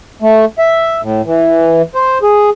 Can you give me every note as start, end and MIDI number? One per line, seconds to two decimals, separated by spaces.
0.22 0.45 57
0.58 1.01 76
1.02 1.22 45
1.26 1.82 52
1.95 2.18 72
2.22 2.50 68